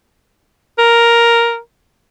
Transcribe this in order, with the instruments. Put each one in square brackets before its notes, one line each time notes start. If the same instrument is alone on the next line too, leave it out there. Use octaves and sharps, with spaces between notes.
[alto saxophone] A#4